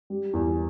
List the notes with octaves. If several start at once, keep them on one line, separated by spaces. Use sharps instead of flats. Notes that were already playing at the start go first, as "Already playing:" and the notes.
G3
E2